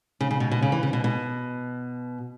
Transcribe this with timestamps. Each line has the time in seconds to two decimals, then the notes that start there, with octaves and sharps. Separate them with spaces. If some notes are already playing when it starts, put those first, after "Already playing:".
0.20 C#3
0.31 C#3
0.40 B2
0.51 B2
0.62 C#3
0.72 E3
0.83 C#3
0.93 B2
1.04 B2